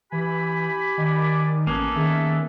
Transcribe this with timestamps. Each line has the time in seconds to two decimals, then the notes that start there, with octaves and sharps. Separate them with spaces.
0.12 E3 G4 G#5 B5
0.98 D#3 D5
1.67 A1 A#3 B3 C#4 A4
1.96 D#3 G#4 E5